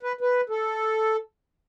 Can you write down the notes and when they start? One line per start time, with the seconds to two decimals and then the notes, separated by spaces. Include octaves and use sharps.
0.03 B4
0.21 B4
0.50 A4